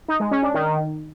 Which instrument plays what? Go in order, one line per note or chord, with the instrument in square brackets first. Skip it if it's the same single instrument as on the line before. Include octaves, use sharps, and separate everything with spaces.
[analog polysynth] D#4
G#3
C#4
D4
D#3